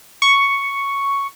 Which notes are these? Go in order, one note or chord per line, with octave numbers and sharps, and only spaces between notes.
C#6